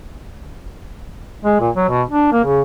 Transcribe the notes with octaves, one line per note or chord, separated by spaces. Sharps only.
G#3
A#2
F#3
B2
D4
A#3
C#3